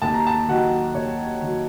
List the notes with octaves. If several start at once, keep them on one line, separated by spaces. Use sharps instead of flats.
D#2 A5
A#5
A5
D#3 F#3 F#5
D#2 C#5
D#3 F#3